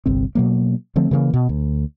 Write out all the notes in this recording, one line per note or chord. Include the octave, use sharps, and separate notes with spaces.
G1 C2 C4
B2 F#3 A#3
D3 F3 A3 C4
C#3 E3 G3 A#3
B2
D2